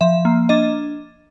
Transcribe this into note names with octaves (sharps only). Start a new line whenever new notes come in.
F3 E5
A#3
D4 D#5